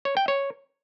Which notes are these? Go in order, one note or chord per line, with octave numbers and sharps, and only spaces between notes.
C#5
G5
C#5